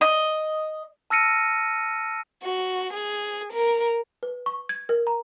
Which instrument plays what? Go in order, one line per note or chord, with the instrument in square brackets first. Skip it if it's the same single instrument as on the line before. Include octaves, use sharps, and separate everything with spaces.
[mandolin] D#5
[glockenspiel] A5 E6 F6 A#6 C#7 D#7
[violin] F#4
G#4
A#4
[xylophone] B4
C#6
G#6
A#4
A#5